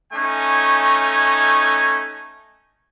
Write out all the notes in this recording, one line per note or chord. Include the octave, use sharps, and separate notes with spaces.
A3 C#4 D#4 G#5